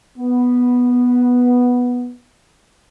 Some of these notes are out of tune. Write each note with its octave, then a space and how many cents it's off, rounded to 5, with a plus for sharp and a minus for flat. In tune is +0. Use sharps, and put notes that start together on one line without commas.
B3 -5